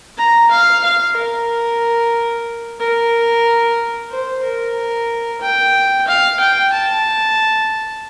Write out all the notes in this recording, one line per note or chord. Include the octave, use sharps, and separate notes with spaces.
A#5
F5
F5
A#4
A#4
C5
A#4
G5
F5
G5
A5